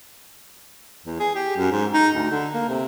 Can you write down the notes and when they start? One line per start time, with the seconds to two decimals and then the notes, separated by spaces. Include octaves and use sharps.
1.06 E2
1.20 G#4
1.35 G4
1.57 F#2
1.71 G#2
1.94 D#4
2.15 D2
2.31 D3
2.54 A#3
2.68 C3